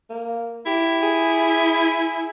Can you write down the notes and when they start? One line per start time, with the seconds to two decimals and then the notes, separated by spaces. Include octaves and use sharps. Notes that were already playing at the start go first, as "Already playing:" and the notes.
0.10 A#3
0.66 E4 G4
1.02 G#4